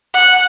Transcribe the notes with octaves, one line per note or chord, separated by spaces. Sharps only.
F#5